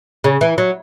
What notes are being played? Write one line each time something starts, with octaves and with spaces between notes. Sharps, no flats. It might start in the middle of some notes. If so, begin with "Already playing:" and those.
C#3
E3
F#3